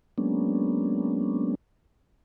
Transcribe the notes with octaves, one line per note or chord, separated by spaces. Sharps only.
F#3 G#3 A#3 B3 C#4 D4